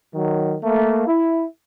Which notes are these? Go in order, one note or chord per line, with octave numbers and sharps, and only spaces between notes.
D#3 F#3
A3 A#3
E4